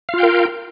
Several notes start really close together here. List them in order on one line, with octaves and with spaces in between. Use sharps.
F5 F4 G5 A#4